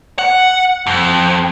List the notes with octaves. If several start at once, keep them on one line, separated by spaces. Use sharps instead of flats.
F#5
F2